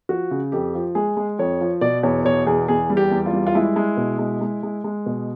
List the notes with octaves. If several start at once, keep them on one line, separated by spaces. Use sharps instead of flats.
F3 F#4
C#3
F2 G4
F3
G#3 G#4
G#3
F2 C#5
F3
B2 D5
E2 C#5
B2 C#5
E2 G#4
E2 G#4
G3
G4
E2
F4
G3
F4
G#3 E4
G#3
B2
G#3
G#3
G#3
G#3
B2